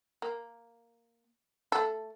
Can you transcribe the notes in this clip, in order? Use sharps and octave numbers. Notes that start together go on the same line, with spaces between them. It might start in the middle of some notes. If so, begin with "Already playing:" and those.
A#3
A3 A4